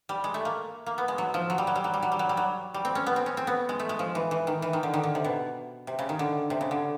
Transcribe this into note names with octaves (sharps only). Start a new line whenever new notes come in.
G3
G#3
A3
A#3
A#3
B3
G#3
F#3
F3
F#3
G3
F#3
G3
F#3
G3
F#3
G3
F#3
G3
F#3
G3
C4
C#4
B3
C4
C#4
C4
B3
G#3
A3
G#3
F3
E3
E3
D#3
E3
D#3
D3
D#3
D3
C3
B2
C3
C#3
D#3
D3
C3
C#3
D3